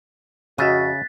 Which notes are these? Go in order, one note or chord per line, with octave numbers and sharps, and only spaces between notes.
F2 C#3 F#4 D#5 E5 F#6 A6 B6